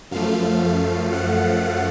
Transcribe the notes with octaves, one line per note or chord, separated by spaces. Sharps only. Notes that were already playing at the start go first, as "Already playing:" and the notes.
F#2 F3 A3 F5
F#5